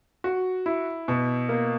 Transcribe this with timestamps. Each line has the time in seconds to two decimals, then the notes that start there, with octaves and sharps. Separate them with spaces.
0.24 F#4
0.66 E4
1.08 B2
1.49 A#3